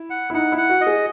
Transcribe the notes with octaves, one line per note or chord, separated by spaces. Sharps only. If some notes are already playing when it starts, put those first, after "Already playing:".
Already playing: E4
F#5
E4
D#4 F#5
E4
F#5
F#4
D#5
G#4